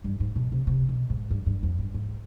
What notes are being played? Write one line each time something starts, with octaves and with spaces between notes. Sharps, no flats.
G2
G#2
B2
C3
C3
B2
G#2
G2
G2
F2
G2
G#2